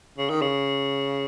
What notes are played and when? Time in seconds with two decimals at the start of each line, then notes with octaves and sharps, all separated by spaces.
0.18 C#3
0.30 D#3
0.42 C#3